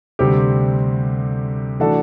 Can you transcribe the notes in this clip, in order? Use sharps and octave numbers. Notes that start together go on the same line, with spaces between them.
D2 C3 G3 C4 G4
E3 A3 D4 F#4 A4